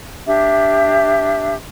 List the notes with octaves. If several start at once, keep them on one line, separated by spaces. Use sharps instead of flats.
D4 G4 E5